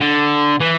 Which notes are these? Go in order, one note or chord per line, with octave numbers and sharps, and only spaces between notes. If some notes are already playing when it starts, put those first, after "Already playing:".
D3
E3